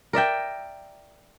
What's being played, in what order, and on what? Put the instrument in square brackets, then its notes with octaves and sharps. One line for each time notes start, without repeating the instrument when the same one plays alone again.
[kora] A#4 D5 E5 G5